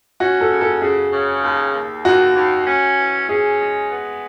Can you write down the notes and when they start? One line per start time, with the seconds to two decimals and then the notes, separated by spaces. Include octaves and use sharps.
0.20 C#4 F#4
0.41 A4
0.51 C#3
0.61 A4
0.82 C#3 G#4
1.13 C#3
1.43 D#2
1.74 D#2
2.05 D#2 F#4
2.36 D#2
2.67 C#4
2.98 E3
3.29 C#4 G#4
3.61 G#3
3.91 B3